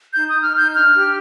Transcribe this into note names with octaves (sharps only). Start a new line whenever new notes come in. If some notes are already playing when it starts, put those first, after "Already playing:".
D#4 G6
D#4 D#6
F6
D#4
G6
D4 F6
G4